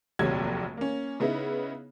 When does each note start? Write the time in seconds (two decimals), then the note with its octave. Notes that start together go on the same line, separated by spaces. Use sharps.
0.19 F1 A#1 D#2 C3 F#3 G#6
0.77 A#3 C#4
1.20 C#3 B3 D#4 E4